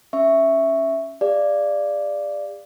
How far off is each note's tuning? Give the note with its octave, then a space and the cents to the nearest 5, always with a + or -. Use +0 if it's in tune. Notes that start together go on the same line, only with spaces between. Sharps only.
C#4 -5 E5 +0 C#6 +0
G#4 -40 D5 +0 F5 -20